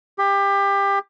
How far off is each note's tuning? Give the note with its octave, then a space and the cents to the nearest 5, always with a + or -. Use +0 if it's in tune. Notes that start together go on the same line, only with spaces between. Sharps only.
G4 +25